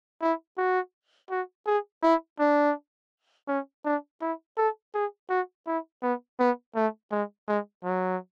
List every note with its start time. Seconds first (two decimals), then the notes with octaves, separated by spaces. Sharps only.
0.22 E4
0.58 F#4
1.30 F#4
1.66 G#4
2.03 E4
2.39 D4
3.48 C#4
3.85 D4
4.21 E4
4.57 A4
4.94 G#4
5.30 F#4
5.67 E4
6.02 B3
6.40 B3
6.76 A3
7.11 G#3
7.48 G#3
7.84 F#3